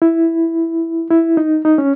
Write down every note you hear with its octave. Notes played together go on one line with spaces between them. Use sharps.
E4
E4
D#4
D#4
C#4